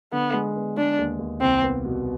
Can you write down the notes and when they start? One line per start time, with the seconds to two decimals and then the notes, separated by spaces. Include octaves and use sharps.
0.12 D3 B3
0.33 G#3
0.56 B3
0.77 G#3 D4
0.99 D#2
1.19 D#2
1.41 C2 C4
1.63 B3
1.84 B2